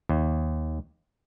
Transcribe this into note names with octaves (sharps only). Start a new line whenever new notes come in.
D#2